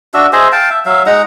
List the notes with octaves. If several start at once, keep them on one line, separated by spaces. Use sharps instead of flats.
D4 F#4 E5
G#4 C5 D#5 E5
F5 G5 A5
E5
F#3 E5 F5
G#3 D#4 F#5 A#5